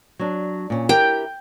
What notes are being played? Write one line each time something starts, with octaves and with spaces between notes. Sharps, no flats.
F#3 D4
A#2 C#4
E4 G4 A#4 G5